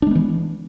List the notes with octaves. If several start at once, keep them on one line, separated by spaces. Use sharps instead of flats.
E3 G#3 B3 D4